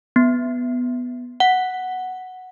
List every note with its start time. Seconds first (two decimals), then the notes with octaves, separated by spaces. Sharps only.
0.16 B3
1.40 F#5